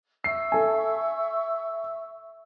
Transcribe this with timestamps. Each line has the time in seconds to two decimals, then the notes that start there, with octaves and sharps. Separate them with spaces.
0.24 E5 C#6 E6 C7
0.52 A4 G#5